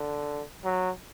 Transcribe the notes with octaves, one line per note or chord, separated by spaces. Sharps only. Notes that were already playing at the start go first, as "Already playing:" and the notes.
Already playing: D3
F#3